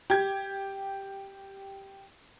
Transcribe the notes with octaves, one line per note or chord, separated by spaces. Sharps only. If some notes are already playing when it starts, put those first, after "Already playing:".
G4 G#6